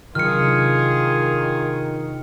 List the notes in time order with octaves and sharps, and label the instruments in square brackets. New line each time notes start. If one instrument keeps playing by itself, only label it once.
[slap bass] C3 F#3 D4 [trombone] D#3 [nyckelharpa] F4 G#4 [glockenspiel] F6 C#7